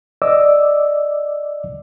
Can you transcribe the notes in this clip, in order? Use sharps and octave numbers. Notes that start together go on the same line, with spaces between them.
D5 D#5 D6 E6